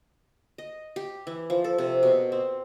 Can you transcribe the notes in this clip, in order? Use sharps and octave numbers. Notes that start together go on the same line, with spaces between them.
D#5
G4
E3
F3
A4
C3
B2
C4